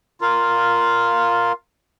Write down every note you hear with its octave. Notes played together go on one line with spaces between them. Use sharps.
F4 A#4 F5